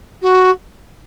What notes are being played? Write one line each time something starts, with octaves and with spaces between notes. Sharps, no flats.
F#4